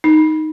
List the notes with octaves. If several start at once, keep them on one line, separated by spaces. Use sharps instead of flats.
D#4